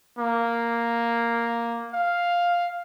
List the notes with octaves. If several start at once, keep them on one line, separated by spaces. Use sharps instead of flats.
A#3
F5